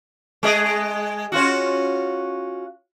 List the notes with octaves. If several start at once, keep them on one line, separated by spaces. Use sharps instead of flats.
G#3 G#4 D#5
C#4 F4 F#4